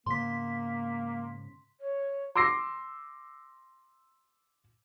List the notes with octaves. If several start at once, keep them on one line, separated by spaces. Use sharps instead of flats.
G#2 C#3 A#3 B3 C6 B6
C#5
C6 D6 E6 A#6 C7